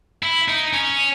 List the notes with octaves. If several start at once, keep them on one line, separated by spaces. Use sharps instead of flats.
E4
D#4
C#4